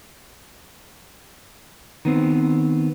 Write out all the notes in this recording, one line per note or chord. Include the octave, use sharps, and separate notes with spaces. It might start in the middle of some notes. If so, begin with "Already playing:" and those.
D#3 B3 C4